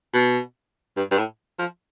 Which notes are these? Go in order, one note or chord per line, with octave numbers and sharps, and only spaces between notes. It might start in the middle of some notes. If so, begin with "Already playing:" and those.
B2
G2
G2
A2
F3